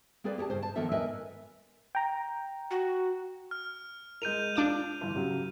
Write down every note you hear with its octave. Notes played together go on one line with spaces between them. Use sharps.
A#3 C4 G#4 A4 B4 D5
G4 G#4 F#5 A5
G2 C#3 C5
A5
D#3 F3 A#3 B3 A4 E5
A#4 B4 D#5 E5 G#5
G5 A#5
F#4
F6
G#3 A#4 G6 D#7 F7
D4 F4 D6 E7
G1 E3
C#3 F#3 G4